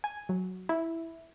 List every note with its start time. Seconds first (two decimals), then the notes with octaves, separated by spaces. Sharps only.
0.04 G#5
0.29 F#3
0.69 E4